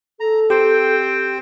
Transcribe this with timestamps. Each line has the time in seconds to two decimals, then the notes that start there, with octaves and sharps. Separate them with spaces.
0.20 A4 A#5
0.50 C4 G4 C5 G5